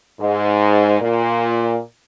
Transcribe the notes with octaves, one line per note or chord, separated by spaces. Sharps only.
G#2
A#2